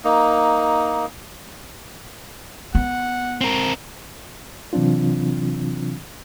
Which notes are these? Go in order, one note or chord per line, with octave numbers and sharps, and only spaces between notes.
A#3 D#4
B3 F#5
C4 A#4
C3 E3 F#3 C4 D4 F4